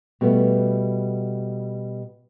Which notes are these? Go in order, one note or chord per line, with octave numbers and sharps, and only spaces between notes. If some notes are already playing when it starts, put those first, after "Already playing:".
B2 G3 A3 B3